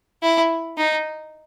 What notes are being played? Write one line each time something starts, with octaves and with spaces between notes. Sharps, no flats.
E4
D#4